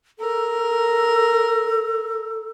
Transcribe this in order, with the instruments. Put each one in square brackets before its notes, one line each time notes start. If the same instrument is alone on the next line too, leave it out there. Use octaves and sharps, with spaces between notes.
[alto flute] A4 [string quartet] A#4